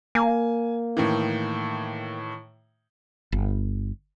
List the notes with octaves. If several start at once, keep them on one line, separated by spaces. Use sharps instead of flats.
A#3 G#5
A2 D#3 E3
G1